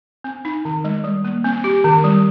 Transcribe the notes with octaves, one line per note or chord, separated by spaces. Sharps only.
C4
D#4
D#3
G#3
G3
A#3
C4
G4
D#3
G3